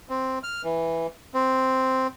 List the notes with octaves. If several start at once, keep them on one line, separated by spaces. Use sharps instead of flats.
C4
F6
E3
C4